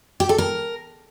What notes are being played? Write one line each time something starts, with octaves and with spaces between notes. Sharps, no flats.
G4
A4
A#4